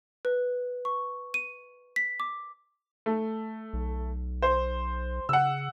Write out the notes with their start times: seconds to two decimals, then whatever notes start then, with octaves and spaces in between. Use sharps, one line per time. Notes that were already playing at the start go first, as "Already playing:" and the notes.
0.25 B4
0.85 C#6
1.34 D#7
1.96 B6
2.20 D6
3.06 A3
3.73 B1
4.42 C5
5.29 C#3 F#5 E6